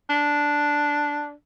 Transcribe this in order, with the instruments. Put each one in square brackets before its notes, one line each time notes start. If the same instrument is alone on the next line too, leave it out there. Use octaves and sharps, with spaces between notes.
[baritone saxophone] D4